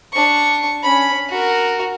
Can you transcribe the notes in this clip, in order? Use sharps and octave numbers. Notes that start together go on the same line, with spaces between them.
D4 C#6
C#4 B5
F#4 A#4